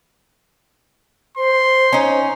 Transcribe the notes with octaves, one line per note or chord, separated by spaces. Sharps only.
C5 C6
C#4 D#4